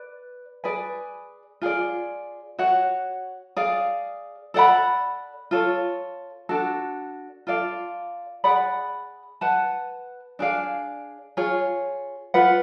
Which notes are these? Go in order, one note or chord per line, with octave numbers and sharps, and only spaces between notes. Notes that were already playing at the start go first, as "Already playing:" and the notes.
Already playing: B4 D5
G#4 B4 D5 G#5
F4 G#4 D5
F#4 C#5 F#5
G#4 D5 F5
A4 D5 F#5 B5
F4 A4 C#5
D4 F#4 A4
F4 A4 D5 F5
G#4 D5 F#5 B5
B4 F#5 A5
D4 G#4 D5 F5
F4 G#4 C#5
F4 B4 F#5